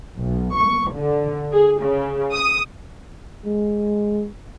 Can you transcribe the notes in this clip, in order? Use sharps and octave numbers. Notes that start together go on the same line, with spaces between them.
B1
C#6
D3
G#4
C#3
D#6
G#3